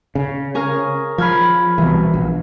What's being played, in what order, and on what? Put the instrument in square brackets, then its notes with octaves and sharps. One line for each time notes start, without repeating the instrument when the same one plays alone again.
[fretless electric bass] C#3
[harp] C#4 G#4 A#4
[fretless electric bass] F3 [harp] B5 F6 G#6
[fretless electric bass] C2 B2 [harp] E3
[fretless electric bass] A#1